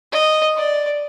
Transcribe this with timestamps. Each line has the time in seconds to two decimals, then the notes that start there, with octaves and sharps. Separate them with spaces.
0.12 D#5
0.56 D5